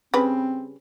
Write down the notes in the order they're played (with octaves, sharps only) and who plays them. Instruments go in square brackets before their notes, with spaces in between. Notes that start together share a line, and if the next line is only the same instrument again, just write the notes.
[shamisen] C#3 G3 B4 [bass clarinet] C4